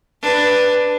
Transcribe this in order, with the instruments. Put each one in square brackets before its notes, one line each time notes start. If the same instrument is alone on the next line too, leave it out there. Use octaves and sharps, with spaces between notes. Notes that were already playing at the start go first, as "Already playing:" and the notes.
[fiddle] D4 B4